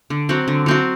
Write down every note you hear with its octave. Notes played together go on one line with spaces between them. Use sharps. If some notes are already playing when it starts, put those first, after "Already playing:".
D3
F#3 C4 F#4
D3
F#3 C4 F#4